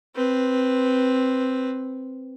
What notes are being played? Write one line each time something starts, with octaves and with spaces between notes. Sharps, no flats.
C4 B4